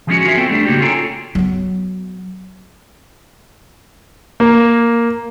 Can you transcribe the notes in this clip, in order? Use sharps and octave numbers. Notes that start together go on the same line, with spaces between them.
E3 F3 G#3 A#3 C#4 F#4
F4 F#4 G#4 A#4 E5
B3 C4 A4 C5 G5
G3 A3 D4
C#3 A#3 D#4 F#4 G4
C#4 F4 G#4 A4 G5 A#5
F#3 B3
A#3